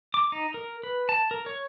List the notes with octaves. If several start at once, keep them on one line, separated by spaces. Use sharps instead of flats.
D6
D#4
A#4
B4
A5
A#4
C#5